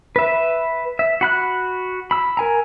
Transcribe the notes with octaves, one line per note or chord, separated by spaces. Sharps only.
B4 E5
E5
F#4 B5 F#6
B5 E6
A#4 G#5 A#5